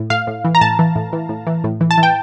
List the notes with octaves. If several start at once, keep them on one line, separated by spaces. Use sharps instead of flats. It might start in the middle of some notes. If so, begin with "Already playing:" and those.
Already playing: A2
A2 F5
A2
E3
A#5
A2 A5
E3
A2
E3
A2
E3
A2
E3
A5
E3
G5